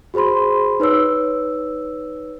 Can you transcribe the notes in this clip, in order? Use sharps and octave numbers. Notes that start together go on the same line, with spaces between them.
F#4 G#4 C5 B5 C6
D#4 B4 C#5 E6